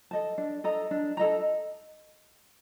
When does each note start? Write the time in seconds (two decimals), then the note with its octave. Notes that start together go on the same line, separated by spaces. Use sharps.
0.11 A4 D#5 A5
0.38 D4
0.64 A4 D#5 A#5
0.91 D4
1.17 A4 D#5 A#5